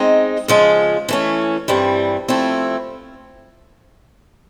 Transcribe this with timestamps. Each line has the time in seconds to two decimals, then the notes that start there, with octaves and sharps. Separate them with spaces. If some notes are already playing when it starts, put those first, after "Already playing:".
Already playing: G#3 C4 D#4
0.48 C#3 F3 G#3
1.09 E3 A3 C#4
1.68 G2 E3 G3 C4
2.28 F3 A3 C4 E4